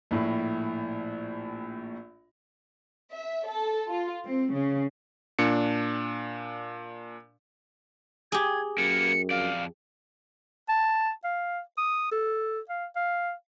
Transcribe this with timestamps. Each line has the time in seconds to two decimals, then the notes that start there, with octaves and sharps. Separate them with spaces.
0.11 A#1 A2
3.11 E5
3.47 A4
3.89 F4
4.25 C4
4.53 C#3
5.39 A#2 D4 C#7
8.32 G4 G#4 G#6
8.78 F#2 A#3 B3 C#7
9.31 F2 D5 F5
10.69 A5
11.24 F5
11.77 D#6
12.12 A4
12.69 F5
12.96 F5